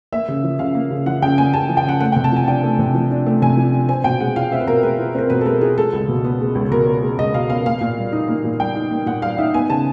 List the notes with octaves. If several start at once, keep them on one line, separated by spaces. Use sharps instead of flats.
A#3 E5
C#3
F3
C#3 F5
A#3
C#3
F3 F#5
C#3 G5
A#3 G#5
C#3 A5
F3
G5
C#3 F#5
A3 F#5
C3 G5
A5
F3 G#5
D4 G5
A3
C3
F3
D4
A3
C3 G#5
F3
D4
C4 G#5
B2 G5
G#3 F#5
F4 F5
C4 E5
B4
B2 A#4
G#3 B4
F4
C4 A#4
B2 B4
A4
G#3 A#4
F4 G#4
G#3 A4
C#2
B2
B3
G#3
C#2
B2 A#4
B3
G#3
C#2 D#5
B2 F5
B3 F5
A#3 F5
A#2
G3
D#4
A#3
A#2
G3 G5
D#4
A#3
A#2 F#5
G3 F5
D#4 E5
B3 G#5
C#3 A5